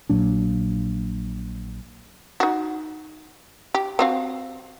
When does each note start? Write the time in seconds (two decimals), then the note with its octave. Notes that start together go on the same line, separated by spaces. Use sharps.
0.09 A#1 A#2 F#3 D4
2.40 D#4 F#4
3.75 G4
3.99 C4 F#4 F5